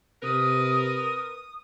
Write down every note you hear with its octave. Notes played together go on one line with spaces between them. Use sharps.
C3 A#4 B4 D#6